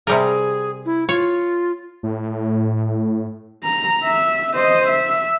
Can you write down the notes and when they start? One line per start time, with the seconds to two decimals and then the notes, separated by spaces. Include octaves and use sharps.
0.07 C3 G3 G#4 A#4
0.86 E4
1.09 F4 C#5
2.03 A2
3.64 A#5
4.05 E5
4.54 C5 D#5
4.89 E5